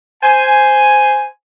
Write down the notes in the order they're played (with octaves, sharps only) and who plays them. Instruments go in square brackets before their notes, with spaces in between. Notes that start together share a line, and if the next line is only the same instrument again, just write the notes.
[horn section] C5 G#5